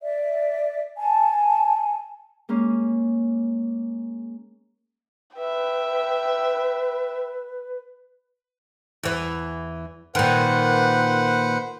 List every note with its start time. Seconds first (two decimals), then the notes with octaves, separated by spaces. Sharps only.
0.02 D5 E5
0.97 G#5 A5
2.49 G#3 A#3 C#4
5.37 B4 E5 G5
9.03 E2 E3
10.15 A#2 D#3 B4 C5 F#5